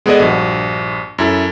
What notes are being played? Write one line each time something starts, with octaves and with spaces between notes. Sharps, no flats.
G#3 B3 G#4 A4 D5 D#5
A#1 G2 F#4
F#2 E4 A4